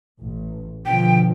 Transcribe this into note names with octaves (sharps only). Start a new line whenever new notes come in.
A1
B2 D3 F3 G5